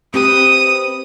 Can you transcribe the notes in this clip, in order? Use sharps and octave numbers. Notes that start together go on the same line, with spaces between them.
C4 G4 B4 D#6